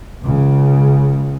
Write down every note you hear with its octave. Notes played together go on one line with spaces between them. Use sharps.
C#2 C#3